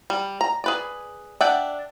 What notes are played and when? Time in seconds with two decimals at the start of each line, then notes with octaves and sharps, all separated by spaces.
0.10 G3
0.41 A#5
0.64 G#4 B4 D5
1.41 D4 D5 E5 F#5 G5